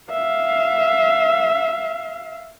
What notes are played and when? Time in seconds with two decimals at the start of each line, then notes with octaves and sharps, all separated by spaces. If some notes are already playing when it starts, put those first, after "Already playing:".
0.11 E5 F5